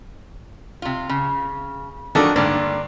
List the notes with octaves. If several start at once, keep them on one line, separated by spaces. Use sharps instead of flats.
C3 F4
C#3
D#3 F3 A3 D4 F#4 A4
G2 D3 A#3 D5